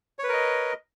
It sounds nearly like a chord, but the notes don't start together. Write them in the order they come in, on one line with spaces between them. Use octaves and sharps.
C#5 B4 A#4 D#5